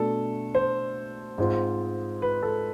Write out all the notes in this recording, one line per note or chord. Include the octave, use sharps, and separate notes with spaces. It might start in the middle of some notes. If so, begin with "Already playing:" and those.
Already playing: B2 A3 D4 A4
C5
G#2 G#3 C4 F4
B4
A4